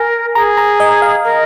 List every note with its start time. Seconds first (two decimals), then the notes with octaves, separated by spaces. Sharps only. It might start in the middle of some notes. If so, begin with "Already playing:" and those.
Already playing: A#4 G#5
0.35 G#4 A#5
0.57 A#5
0.80 D#5
1.02 F5
1.24 A#4